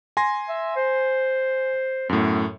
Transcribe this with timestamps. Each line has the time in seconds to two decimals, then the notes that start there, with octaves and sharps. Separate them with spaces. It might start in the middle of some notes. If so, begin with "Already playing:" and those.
0.17 G#5 C6 A#6
0.49 E5
0.76 C5
2.09 F#2 A2 B3